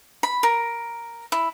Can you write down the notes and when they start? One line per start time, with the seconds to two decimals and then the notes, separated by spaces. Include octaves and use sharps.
0.23 B5
0.43 A#4
1.32 E4